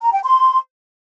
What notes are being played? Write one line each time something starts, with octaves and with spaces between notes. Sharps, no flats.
A#5
G5
C6